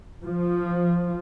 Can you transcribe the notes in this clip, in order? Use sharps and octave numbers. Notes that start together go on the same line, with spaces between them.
F3